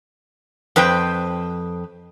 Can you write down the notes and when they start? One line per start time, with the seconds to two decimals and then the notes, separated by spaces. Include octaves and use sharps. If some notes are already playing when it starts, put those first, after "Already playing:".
0.76 F2 B4 C5 G5